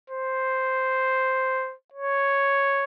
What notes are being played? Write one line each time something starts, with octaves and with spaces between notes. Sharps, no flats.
C5
C#5